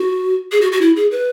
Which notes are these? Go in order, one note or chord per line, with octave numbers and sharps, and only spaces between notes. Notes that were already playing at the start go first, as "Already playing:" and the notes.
Already playing: F#4
G#4
F#4
F#4
E4
G#4
B4